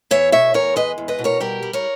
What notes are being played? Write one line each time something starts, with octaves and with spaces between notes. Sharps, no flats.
E2 C#5 E5
B2 C#5 E5
E2 A#4 C#5
G#3 B4 D#5
E2
B4 D#5
B2
A#4 C#5
G3 G4 A#4
G3
A#4 C#5